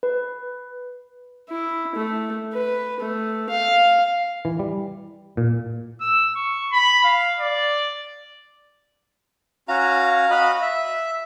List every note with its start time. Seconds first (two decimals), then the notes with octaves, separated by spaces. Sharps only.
0.03 B4
1.49 E4
1.96 A3
2.54 B4
3.01 A3
3.50 F5
4.45 E3
4.59 G3
5.37 A#2
6.01 E6
6.36 C#6
6.72 B5
7.04 F5
7.39 D5
9.69 C#4 F#4 F5 A#5
10.30 F#4 D#5 B5
10.62 E5